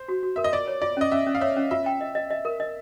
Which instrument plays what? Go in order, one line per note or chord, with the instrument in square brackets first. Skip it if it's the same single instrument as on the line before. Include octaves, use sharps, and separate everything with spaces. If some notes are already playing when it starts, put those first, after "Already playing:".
Already playing: [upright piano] C5
[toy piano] F#4
F#4
[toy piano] A#4 [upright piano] E5
[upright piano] D#5
[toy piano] F4 [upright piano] D5
[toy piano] C#5
[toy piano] F4 [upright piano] D5
[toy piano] C#4 [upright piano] D#5
[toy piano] C#4 [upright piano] E5
[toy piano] C#4
[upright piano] F5
[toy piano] C#5 [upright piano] E5
[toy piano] C#4
[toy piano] F4 [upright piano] E5
[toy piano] G5
D#5
D#5
D#5
A#4
D#5